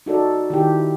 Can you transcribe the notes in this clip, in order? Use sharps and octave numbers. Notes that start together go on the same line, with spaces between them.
D#4 F#4 A4 D5
D#3 E4 G4